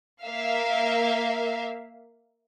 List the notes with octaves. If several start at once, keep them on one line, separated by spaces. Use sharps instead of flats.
A#3 E5 F5